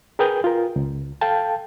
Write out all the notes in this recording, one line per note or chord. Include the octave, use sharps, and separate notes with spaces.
G#4 A#4 B4 G5 D#6 G6
F4 A#4
C#2
A4 F5 G5 A5